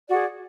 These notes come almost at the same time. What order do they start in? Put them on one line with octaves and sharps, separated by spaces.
D5 F#4 G#4